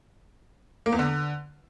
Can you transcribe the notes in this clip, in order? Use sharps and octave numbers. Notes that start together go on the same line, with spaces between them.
A#3
E2
D3